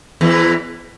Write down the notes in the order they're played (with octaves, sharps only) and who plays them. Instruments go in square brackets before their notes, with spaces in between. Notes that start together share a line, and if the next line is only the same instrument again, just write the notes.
[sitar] E2 E3